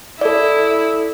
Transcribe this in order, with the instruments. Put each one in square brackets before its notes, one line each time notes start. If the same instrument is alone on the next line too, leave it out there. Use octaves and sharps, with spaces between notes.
[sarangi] E4 [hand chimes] A4 D5